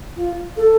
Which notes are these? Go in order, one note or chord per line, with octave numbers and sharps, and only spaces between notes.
F4
A4